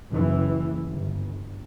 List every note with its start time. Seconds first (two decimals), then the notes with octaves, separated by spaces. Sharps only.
0.14 F#1 E3
0.89 G1